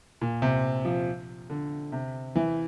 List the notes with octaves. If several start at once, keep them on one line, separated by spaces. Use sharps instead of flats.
A#2
C3
F3
D3
C3
E3